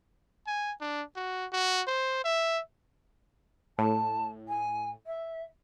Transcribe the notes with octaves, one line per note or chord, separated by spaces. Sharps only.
G#5
D4
F#4
F#4
C5
E5
A2 A5
G#5
E5